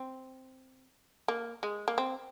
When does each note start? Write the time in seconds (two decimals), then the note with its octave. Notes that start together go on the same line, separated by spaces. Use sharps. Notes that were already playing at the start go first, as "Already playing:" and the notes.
Already playing: C4
1.28 A#3
1.63 G#3
1.88 A#3
1.98 C4